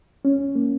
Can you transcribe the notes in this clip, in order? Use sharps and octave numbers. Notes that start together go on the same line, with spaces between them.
C#4
A#3